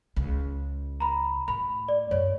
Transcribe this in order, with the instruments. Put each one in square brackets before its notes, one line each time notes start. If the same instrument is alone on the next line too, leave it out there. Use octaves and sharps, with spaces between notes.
[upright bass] C#2
[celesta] A#5 B5
[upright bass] A2 [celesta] B5
[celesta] D5
[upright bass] F#2 A2 [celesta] C#5